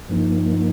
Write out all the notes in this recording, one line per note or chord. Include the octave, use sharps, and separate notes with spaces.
G2 F3 A#3 D#4